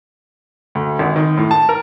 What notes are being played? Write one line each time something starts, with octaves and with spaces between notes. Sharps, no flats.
D2
G#1
D#3
A2
A5
A#4